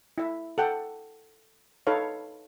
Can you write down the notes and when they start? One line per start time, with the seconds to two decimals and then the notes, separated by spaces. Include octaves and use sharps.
0.18 E4 E5
0.58 A4 F#5 G5
1.87 D#4 A4 B4 C#5 F5